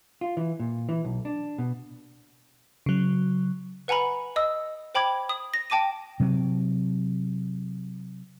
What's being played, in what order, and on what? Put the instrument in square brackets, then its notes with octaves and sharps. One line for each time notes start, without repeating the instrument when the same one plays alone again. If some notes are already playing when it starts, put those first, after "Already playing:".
[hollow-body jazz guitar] F4
E3
A#2
E3
B1
D4
B2
[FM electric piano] C#3 F#3
[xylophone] B4 F#5 G#5 A#5 B5
D#5 D#6 E6
C5 G5 B5 D6 G#6
D#6
A#6
G5 A5 D6 A#6 D#7
[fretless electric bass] C3 F#3 C4